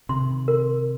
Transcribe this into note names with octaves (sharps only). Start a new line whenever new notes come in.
C3 D#3 C6
A#4